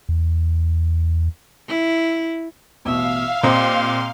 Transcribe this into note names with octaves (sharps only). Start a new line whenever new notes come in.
E2
E4
A1 B2 E5 F5
A#2 C4 G4 D#5 A#5 C6 D#6